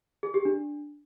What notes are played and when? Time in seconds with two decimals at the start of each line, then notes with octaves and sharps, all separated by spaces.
0.23 G#4
0.34 G4
0.45 D4